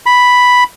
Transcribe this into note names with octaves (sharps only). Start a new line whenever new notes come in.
B5